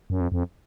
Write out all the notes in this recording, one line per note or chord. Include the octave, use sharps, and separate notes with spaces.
F#2
F2
F2